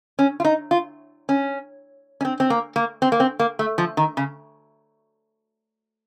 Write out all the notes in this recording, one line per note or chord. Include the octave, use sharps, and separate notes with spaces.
C#4
F4
D#4
F4
C#4
C#4
C4
C4
A#3
A#3
C4
A#3
C4
A#3
A3
F3
D#3
C#3